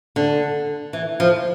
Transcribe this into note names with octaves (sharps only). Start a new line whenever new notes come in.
D3
E3
F3